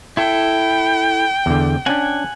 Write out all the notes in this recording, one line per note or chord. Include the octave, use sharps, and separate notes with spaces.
E4 A4 G5
E2 D3
C#4 D4 F#5 G#5